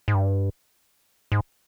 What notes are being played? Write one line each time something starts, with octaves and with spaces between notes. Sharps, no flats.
G#2
G2
G#2